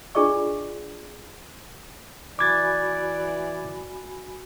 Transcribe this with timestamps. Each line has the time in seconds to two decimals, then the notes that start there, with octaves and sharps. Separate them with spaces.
0.15 D4 F4 G#4 D5 D#5 C#6
2.39 E3 F#4 D5 G#5 B5 D6 G#6 A6